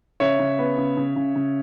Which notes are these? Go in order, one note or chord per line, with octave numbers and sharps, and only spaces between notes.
C#3 C#5 E5
C#3
B3
C#3
C#3
C#3
C#3